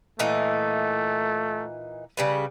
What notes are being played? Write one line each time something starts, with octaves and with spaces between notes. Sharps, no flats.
A#2 E3 A3 D#4
C#3 G3 B4